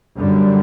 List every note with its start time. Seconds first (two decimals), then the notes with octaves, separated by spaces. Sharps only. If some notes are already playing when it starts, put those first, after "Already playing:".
0.17 F#2 D3 G3